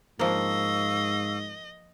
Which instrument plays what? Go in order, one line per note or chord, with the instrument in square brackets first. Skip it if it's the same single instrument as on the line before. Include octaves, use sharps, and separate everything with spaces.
[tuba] G#2 [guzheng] F3 A#3 [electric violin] D#5 [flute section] F5 C#6 E6